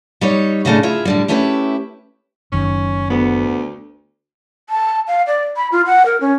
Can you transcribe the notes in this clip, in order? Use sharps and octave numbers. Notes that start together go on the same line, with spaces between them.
G3 D#4 C#5
A2 C#3 G3 A3 D4 D#4
E4 F4 G#4 E5
A2 D3 G3
A3 C#4 E4 G4 A#4 B4
F#1 F#2 D#3 C#4
D2 B3
A5
F5
D5
B5
F4
F#5
A#4
C#4